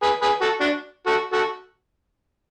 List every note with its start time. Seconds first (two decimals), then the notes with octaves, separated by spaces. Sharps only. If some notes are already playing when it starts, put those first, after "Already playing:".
0.02 G#4 B4
0.22 G#4 B4
0.41 F#4 A4
0.61 D4 F#4
1.07 F#4 A4
1.33 F#4 A4